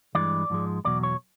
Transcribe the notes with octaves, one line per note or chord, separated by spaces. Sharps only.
G2 E3 G#3 D5
G#2 F3 G#3
E2 B2 F#3 D5
C#5